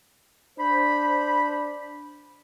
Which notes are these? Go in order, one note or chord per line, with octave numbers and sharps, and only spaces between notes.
D4 C5 B5